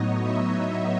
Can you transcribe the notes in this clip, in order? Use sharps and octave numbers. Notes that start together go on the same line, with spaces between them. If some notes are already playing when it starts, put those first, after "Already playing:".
Already playing: A2 F#3 B3 D#4 C#5 D#5
E5